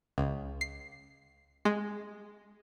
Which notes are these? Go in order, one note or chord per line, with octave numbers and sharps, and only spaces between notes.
C#2
C7
G#3